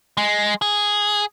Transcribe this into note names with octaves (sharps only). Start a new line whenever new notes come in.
G#3
G#4